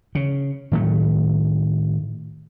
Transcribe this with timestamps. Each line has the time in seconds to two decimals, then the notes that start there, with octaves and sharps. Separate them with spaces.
0.15 C#3
0.72 A2 D#3 F#3 A3